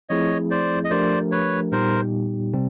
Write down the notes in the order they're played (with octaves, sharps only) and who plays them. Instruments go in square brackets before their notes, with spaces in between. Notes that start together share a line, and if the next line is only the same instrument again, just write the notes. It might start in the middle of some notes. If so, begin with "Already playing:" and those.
[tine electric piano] F3 A3 C4 E4 G#4 [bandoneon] C#5 D#5
[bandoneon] C5 D5
D#5
[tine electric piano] F3 A3 D4 G4 A#4 [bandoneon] C5 D5
[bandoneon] B4 C#5
[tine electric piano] A#2 G3 B3 D#4 G4 [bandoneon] A#4 C5
[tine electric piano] C3 G3 C4